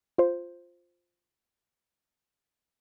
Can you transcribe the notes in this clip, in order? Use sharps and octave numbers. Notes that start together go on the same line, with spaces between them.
F4 C5